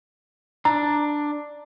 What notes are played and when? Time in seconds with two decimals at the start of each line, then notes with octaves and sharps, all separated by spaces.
0.65 D4 A#5